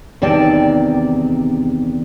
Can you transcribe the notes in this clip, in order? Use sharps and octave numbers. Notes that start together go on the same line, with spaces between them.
E2 C3 D#3 D5 A5